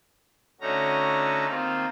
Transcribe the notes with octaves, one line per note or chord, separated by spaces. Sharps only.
D3 A3 C#4 D#4 F#4 A#5
D#3 A#3 C4 F4